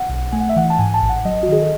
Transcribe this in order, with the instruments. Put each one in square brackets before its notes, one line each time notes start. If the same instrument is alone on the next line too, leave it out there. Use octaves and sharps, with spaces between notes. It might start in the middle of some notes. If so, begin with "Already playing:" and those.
Already playing: [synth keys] F#5
B1
A3 G#5
F#5
E5
E3 F#5
A5
G#2 G#5
A5
A1
F#5
F#3 D#5
F#4
D#3 G#4
A4